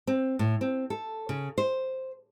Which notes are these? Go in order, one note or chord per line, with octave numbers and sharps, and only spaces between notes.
C4
A2
C4
A4
C#3
C5